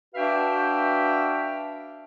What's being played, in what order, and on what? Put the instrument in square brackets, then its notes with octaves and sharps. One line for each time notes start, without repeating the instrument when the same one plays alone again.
[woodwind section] D4 F#4 B4 E5 F5 G5